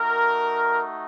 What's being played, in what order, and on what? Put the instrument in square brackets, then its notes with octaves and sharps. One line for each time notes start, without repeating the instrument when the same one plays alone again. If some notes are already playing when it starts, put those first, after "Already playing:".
Already playing: [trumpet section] A3 D#4 F#4 A#4